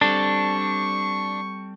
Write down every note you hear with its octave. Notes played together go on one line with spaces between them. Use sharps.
G3 C4 D4 A4 C#6